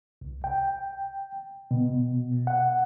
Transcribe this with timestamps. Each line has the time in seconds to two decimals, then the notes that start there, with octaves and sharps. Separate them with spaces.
0.22 C2
0.44 G5
1.71 B2
2.47 F#5